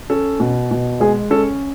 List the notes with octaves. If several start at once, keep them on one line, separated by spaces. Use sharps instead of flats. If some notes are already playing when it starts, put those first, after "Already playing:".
C#4 A4
B2
B2
G#3 G#4
C#4 A4